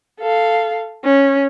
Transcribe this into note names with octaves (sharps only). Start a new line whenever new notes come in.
A4 F5
C#4